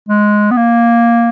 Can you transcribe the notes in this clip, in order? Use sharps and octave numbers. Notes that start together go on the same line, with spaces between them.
G#3
B3
A#3